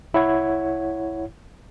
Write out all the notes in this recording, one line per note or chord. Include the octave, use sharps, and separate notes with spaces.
C2 E4 C#5 F#5 G#6